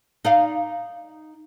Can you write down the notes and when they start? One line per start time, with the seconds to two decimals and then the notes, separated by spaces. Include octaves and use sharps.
0.25 D#4 D5 F5